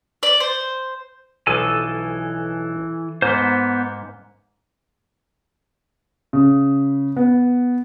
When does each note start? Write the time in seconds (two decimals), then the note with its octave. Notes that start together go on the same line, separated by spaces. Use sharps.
0.23 D5
0.40 C5
1.47 B1 E3 F3 A4 G#5
3.22 G#2 A#3 B3 C5
6.33 C#3
7.17 B3